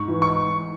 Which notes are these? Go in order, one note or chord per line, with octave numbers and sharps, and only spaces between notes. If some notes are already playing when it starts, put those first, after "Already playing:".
Already playing: G#2 C#6
E3
C#6